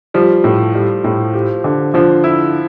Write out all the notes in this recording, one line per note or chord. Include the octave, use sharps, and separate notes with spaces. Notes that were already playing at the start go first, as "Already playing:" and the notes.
F3 G3
A2
G3
A2
G4
D3
D3 F3
E4